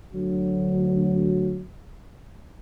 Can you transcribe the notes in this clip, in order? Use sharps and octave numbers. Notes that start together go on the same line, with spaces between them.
D2 F#3